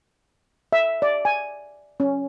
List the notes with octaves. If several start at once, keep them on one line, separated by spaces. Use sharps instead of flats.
E5
D5
G#5
C#4